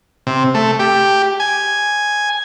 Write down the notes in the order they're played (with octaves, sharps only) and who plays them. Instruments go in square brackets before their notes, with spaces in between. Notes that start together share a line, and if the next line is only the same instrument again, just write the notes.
[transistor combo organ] C3
A3
G4
G#5